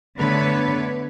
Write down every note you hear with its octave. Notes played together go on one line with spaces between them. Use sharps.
D3 A3 B3 B4 C#5